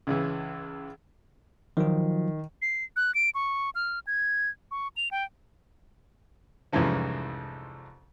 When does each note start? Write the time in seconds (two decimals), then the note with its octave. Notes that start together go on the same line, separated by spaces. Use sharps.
0.07 C#2 C#3 E3
1.77 D#3 F3 F#3 F4
2.62 C7
2.96 F#6
3.15 D7
3.35 C#6
3.75 F6
4.07 G#6
4.71 C#6
4.97 F7
5.11 G5
6.73 C2 F2 G#2 E3 F3 C#4